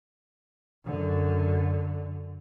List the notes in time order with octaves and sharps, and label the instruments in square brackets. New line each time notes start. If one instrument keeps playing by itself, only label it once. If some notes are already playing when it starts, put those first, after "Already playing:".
[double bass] F#2 D3